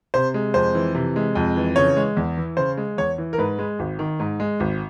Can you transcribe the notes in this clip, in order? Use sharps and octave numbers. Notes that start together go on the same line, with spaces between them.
C3 C5
G#3
F2 C5
E3
C3
G#3
F2
E3
C#3 C#5
G#3
E2
E3
C#3 C5
G#3
E2 C#5
E3
A#4
G#2 B4
G#3
G#1
D#3
G#2
G#3
G#1